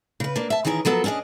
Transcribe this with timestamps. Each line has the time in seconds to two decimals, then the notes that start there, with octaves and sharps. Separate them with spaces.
0.20 C#3 B4
0.36 A#3 D4
0.50 E5 A5
0.65 D#3 E3 C#4 G#4 A#4
0.85 F3 F#3 B3 A4 A#4
1.04 C#4 D4 F#4 G#4 D#5